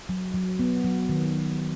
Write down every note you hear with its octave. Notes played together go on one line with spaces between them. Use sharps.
F#3
F#3
B3
F#3
D#3